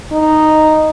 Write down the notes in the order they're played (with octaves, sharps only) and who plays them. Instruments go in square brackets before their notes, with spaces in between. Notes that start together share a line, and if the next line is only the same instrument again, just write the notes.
[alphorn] D#4